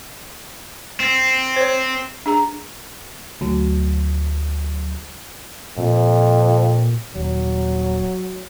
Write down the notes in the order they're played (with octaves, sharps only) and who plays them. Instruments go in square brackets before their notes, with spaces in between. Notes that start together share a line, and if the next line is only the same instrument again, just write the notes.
[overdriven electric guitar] C4
[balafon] C5 C#5
D4 G#4 A#5
[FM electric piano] D2 F#3
[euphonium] F2 [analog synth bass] A#2
[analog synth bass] D#1 [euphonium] F#3